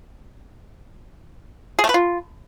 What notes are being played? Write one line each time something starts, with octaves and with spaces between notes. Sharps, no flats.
G#4
A3
B4
F4